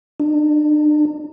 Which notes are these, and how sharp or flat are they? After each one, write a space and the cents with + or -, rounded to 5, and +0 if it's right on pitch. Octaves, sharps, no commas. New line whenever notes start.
D4 +40